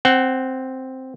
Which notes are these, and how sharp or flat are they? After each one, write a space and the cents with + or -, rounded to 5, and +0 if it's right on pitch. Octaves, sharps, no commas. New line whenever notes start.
C4 +0 F#5 +20